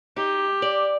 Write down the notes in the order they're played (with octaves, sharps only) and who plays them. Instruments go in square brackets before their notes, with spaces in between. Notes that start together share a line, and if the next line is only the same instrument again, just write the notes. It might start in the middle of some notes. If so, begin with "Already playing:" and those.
[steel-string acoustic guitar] D#4 [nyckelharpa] G4
[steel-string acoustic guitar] D5